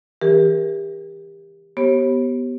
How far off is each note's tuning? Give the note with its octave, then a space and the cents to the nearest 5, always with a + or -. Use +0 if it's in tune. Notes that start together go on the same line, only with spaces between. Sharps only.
E3 +0 G4 +25 A#4 +20
B3 +0 G4 -20 C#5 -40